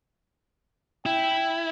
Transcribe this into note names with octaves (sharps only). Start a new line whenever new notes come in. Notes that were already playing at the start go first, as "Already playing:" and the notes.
E4 G5